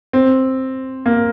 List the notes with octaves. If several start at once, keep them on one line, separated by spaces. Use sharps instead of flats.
C4
A#3